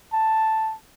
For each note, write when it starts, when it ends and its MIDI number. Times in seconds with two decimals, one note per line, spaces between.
0.13 0.74 81